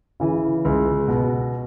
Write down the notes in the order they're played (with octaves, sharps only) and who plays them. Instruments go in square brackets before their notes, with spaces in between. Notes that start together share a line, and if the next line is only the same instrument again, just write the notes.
[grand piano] C#3 E3
C#2
B2